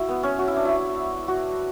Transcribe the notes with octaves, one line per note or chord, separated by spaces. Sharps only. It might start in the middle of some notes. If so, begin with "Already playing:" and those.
Already playing: E4 F#4
B3
C#4
F#4
E4
D4
E4
F#4